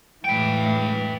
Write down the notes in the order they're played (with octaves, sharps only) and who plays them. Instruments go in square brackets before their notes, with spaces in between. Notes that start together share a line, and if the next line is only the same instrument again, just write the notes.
[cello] A2 E3 [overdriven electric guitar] B4 G5